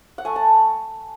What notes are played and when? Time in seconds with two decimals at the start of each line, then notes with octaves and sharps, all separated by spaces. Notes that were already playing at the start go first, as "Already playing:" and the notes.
0.18 F#5
0.25 A3 G#5
0.36 A5